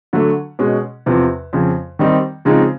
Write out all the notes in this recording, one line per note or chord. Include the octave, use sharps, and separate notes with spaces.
D3 F#3 A3
B2 G#3 C#4
E2 C3 F3
F2 C#3 F3
D#3 G3 C4 D#4
C#3 F3 G#3 C4 D#4